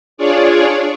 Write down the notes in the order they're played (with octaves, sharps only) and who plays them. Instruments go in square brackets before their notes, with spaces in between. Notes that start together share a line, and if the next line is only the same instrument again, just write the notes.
[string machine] D4 F4 G#4 C#5 D5